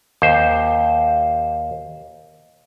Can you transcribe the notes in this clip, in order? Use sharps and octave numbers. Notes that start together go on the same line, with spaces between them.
D#2 C5